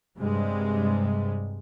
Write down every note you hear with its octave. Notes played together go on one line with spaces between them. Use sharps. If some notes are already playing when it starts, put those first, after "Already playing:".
G2 C3 G3 G#3